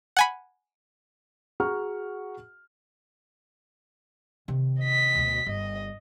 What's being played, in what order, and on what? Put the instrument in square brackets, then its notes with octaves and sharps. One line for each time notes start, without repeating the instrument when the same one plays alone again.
[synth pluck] F#5 G#5 B5
[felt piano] F#4 G#4 F#5 A#5 C#6 F6
[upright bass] C3 D#3
[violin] D#5 B6
[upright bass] D2 B2
[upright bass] G1 [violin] D#5